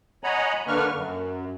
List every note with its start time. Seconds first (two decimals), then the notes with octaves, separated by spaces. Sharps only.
0.24 C#5 D#5 F#5 G#5 A#5 B5
0.67 D3 A#3 D4 B4 C#6 F6
0.95 F#2